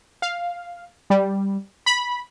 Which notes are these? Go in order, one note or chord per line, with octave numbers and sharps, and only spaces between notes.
F5
G3
B5